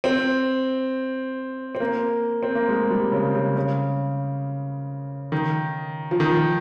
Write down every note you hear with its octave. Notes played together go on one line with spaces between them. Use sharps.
C4
C4
A#3
C4
A#3
G#3
G3
C#3
C#3
C#3
D#3
F3
D#3